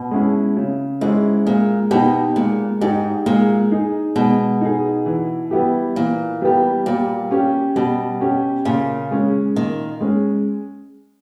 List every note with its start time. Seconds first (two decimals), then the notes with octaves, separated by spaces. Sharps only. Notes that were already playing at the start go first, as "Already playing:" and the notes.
Already playing: B2
0.11 G#3 C#4 E4
0.56 C#3
1.01 G#2 G#3 C#4 E4
1.46 A#2 G#3
1.91 B2 D#4 G4
2.36 A#2 G#3
2.81 G#2 D#4 G4
3.26 A#2 G#3
3.71 D#4 G#4
4.16 B2 G#3
4.61 D#4 G#4
5.06 E3
5.51 G3 B3 E4 G4
5.96 A#2 E3
6.42 G3 B3 E4 G4
6.86 A#2 G3
7.31 C#4 G4
7.76 B2 G3
8.21 C#4 G4
8.65 A#2 C#3
9.11 G#3 C#4
9.56 A#2 D#3
10.01 G#3 C#4